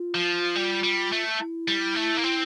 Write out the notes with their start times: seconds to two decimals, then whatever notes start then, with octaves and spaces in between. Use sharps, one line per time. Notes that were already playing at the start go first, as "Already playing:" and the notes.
Already playing: F4
0.14 F3
0.56 G3
0.84 G3
1.12 A3
1.40 E4
1.68 G3
1.95 A3
2.17 A#3
2.24 C4